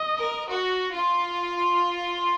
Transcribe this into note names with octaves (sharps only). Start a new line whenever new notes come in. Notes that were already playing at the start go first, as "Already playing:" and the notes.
Already playing: D#5
A#4
F#4
F4